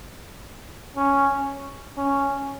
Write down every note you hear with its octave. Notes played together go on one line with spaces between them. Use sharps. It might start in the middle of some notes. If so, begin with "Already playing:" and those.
C#4
C#4